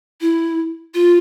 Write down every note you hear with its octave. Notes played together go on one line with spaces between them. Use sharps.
E4
F4